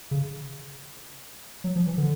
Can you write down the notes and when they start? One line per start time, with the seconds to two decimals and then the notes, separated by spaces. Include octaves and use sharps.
0.11 C#3
1.64 F#3
1.76 F3
1.87 E3
1.97 D3